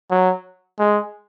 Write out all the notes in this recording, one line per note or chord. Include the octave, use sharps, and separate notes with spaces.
F#3
G#3